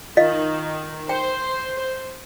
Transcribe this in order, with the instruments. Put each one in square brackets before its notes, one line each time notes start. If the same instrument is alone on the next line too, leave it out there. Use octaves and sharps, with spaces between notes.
[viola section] D#3 [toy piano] F4 D#5 F5
[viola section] C5 [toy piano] G5